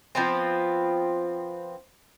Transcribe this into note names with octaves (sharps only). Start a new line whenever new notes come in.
F3 B3 C4